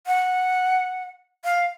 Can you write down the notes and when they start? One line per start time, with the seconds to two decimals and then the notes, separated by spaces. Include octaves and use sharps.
0.07 F#5
1.44 F5